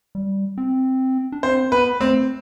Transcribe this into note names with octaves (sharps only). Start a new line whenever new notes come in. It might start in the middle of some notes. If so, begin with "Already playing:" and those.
G3
C4
D4
C4 C5
B3 B4
A3 C4